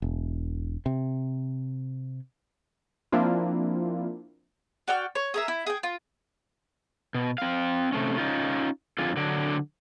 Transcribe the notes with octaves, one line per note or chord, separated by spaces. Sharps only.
E1
C3
F3 A#3 C4 D4 E4 F4
F#4 D5 G5 F6
C#5
G#4 A#4 E5
E4
G#4 G5
F4
B2
C4 F5
C3 A3 C#4
C#4 D#4 F4
F2 D3 F4 G#4
D3 F#3 D4 D5